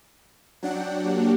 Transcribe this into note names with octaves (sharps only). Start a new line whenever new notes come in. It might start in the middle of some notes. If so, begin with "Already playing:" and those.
F#3 D4 F#5 G5
A#3 G4